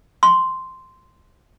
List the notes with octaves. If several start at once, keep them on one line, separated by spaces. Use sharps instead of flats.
C6